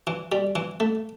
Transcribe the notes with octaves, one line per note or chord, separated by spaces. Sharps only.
E3
G3
E3
A3